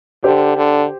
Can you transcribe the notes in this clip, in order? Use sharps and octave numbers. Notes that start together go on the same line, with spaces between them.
D3 G4 C5
D3